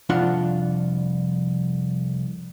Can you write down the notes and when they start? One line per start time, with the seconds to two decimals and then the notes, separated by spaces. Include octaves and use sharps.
0.09 C2 F2 D4 F4 F#5